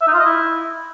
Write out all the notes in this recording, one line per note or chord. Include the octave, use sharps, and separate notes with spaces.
E5
D#4
F4
D#5
E4